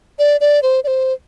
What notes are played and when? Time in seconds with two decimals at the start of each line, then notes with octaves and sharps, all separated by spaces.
0.19 D5
0.41 D5
0.63 C5
0.84 D5
0.87 C5